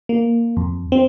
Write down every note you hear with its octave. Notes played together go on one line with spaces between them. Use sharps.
A#3
F2
C4